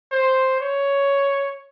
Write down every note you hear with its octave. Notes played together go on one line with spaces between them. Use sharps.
C5
C#5